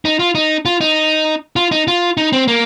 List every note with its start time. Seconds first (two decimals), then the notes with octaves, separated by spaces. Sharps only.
0.05 D#4
0.19 F4
0.35 D#4
0.65 F4
0.81 D#4
1.56 F4
1.71 D#4
1.88 F4
2.17 D#4
2.33 C4
2.48 A#3